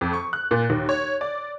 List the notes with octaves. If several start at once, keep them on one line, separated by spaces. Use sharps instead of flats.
F2
C#6
F#6
A#2
D#2
C#5
D5